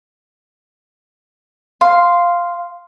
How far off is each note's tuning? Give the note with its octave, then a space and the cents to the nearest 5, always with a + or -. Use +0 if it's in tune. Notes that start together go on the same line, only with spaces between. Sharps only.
F5 +0 C6 -5